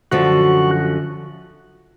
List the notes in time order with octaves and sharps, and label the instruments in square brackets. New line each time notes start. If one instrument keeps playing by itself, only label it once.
[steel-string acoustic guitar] F#2 D3 F3 [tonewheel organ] F#4